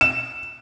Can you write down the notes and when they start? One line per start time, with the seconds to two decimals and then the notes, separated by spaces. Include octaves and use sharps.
0.01 E7